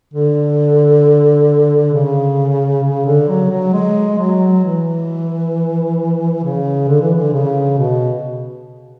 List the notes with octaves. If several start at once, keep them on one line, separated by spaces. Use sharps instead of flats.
D3
C#3
C#3
D3
F#3
F#3
G#3
F#3
E3
C#3
D3
E3
D3
C#3
B2